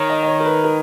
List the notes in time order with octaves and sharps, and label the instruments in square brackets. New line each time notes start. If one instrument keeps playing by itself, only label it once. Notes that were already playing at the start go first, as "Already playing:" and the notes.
Already playing: [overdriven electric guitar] D#3 [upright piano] C#5
[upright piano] D#5
D#5
C#5
A#4
B4
A#4